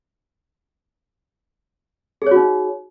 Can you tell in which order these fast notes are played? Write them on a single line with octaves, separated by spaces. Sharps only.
G#4 C#5 F#4 D#4